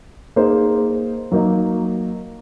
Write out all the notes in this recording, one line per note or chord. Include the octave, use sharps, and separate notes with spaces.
A#3 D#4 G#4 C5
F#3 A#3 D#4